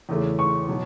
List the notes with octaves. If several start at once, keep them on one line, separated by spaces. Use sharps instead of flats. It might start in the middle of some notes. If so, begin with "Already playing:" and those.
E2 C#3 E3 A3
C#6
B2 F#3